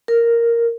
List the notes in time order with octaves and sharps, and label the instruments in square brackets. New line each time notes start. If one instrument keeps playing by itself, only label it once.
[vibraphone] A#4